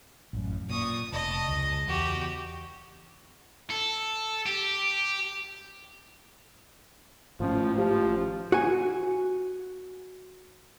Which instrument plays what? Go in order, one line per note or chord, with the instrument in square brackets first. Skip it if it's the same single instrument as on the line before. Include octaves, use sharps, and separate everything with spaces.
[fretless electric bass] A1 F#2
[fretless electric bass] A#2 [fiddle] C#6 D#6
[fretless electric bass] F1 [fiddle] D#5 A5
[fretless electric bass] C#2
[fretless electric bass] E2 [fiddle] F#4 G4
[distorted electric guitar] A4
G4
[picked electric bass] G#1 A2 C#4 [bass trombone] F3
[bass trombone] F3 [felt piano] G4
[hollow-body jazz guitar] F#4 G#5